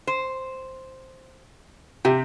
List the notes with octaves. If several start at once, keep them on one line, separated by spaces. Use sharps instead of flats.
C5
C3 G4